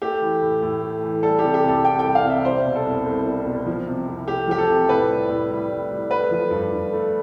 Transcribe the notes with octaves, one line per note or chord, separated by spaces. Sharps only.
A3 G4
E3
A2
A2
A3
E3
G3 A4
C3 G4
G4
C2 A4
C2 G5
G3 G5
F5
C3
E5
G3 C5
B2
A4
C2
C2
G3
B2
F3
C3
C2
A3 G4
F3 G4
A4
C3
A2 B4
G3
A2
G3
A2
G3
A3 B4
F3
G2
G2
A3